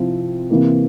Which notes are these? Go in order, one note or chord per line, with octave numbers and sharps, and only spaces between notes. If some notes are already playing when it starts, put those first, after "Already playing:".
Already playing: C3 F3 C4 E4
C3 E3 A#3